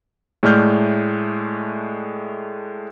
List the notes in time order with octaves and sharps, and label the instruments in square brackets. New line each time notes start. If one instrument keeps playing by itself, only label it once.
[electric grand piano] A2 G#3 A3 D5 F6 G6